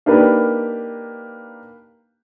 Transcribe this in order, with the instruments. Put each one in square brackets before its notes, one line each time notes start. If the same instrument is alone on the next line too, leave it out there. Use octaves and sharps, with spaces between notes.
[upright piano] A#3 D4 D#4 G4 A#4 B4